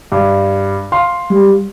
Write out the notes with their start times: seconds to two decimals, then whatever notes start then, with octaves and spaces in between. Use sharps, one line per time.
0.12 G2
0.92 F5 C6
1.30 G3